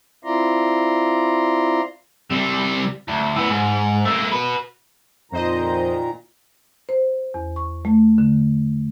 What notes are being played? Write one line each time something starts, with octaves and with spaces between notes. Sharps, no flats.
C4 E4 F4 D5 A#5 C6
C3 G3
D2
A2 B3
G#2
A3 A#3
F#4 B4
F2 A#2 D#3 C5 D#5 A#5
C5
E2
C#6
A3
D3